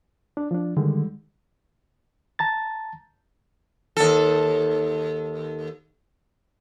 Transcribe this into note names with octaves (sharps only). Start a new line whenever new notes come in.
D4
F3 D4
D3 D#3 G3 G#3
A5 A#5 A6
D#2 A4